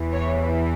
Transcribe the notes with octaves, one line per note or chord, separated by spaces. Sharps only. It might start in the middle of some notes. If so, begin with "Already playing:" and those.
Already playing: E2 E3
C#5